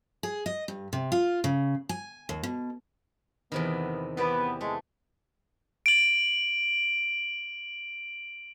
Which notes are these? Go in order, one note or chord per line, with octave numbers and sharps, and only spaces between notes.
G#4
D#5
G2
C3
F4
C#3
G#5
D#2
B2
E2 C3 D#3 B3
E3 B3 G4 D5
G#3 A3
D7 F#7